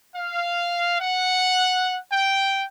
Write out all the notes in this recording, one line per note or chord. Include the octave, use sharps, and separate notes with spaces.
F5
F#5
G5